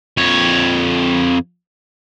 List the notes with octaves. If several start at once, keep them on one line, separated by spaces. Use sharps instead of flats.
F2 C#5